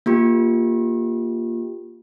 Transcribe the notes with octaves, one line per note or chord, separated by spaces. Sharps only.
A#3 F4 G4